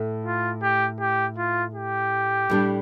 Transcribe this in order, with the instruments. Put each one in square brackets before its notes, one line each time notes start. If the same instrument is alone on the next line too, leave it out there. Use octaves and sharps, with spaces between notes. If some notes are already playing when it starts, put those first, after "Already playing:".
Already playing: [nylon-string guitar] A2 A3
[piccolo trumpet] F4
G4
G4
F4
G4
[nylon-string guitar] A2 G3 D4